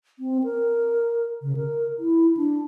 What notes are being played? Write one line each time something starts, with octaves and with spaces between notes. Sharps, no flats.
C4
A#4
C#3
A#4
E4
D4